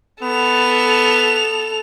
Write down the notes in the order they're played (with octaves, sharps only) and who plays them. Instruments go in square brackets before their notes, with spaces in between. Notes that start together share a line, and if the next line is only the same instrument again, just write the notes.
[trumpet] B3 [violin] A4 F7